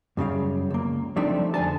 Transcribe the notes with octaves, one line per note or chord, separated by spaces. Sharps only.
F#2 C#3 G3 F5
C#2 A#3
F3 G3 A3 C4 D4 D#4
F2 D3 G#5 A5